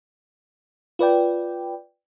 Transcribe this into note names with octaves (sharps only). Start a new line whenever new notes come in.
F4 B4 D5 G5